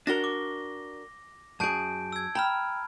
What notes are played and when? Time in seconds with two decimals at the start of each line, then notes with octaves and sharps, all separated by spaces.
0.07 D4 F#4 A#4 A#6 G7
0.24 D6
1.60 F#2 G#4 A5 G6 D7
2.13 E6 G#6
2.35 G5 A#5 B5 F6